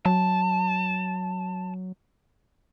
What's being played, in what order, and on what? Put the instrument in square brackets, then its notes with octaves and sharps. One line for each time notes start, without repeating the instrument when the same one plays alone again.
[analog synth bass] F#3 [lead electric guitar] A5